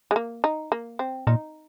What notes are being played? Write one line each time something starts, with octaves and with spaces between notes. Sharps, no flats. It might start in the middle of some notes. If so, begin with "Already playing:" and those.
G#3
A#3
D#4
A#3
C4
A#2 D#4